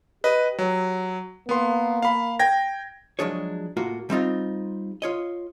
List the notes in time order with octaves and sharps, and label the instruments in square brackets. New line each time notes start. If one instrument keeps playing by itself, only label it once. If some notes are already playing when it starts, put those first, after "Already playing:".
[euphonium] G4 [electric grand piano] B4 D#5
[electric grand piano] F#3
[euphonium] A#3 [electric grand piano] B3 C6
[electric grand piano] F5 B5
G5 G#6 A#6
[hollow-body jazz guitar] F3 F#3 G#3 D4 G#4 C#5
A2 A#3 F4 F#4
G3 C4 D#4 F4
F4 C#5 D#5